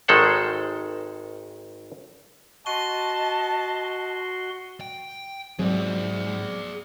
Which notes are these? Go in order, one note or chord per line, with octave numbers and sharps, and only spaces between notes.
G#1 D#3 G#3 A4 C5 F#5
F#4 D#5 A5 C6 C#6 G7
G5
C2 G#2 F#3 G#4 D5